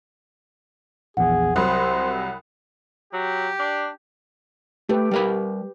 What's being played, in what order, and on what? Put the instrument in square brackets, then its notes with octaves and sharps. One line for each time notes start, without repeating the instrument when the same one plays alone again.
[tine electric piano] A#1 E2 [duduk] G#4 [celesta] F#5
[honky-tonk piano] C2 F#3 D#6 [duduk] C5 [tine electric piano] B5 F#6
[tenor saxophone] F#3 [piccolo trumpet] G4
[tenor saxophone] D4
[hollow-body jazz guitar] A3 [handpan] G4 B4
[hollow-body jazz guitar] G3 A#4 B5